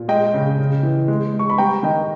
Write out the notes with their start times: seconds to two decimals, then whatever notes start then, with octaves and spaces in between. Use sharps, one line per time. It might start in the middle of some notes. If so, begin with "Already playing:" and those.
Already playing: A#2
0.08 G#3 D#5 G5
0.34 C#3
0.58 C#3
0.83 E3
1.08 G#3
1.33 G#3
1.39 C#6
1.50 B5
1.58 G3 G5 A#5
1.83 D#3 D#5 G5